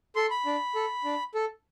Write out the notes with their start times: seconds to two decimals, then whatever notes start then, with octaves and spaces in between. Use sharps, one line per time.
0.16 A4 C6
0.30 B5
0.46 D4
0.75 A4
1.05 D4
1.35 A4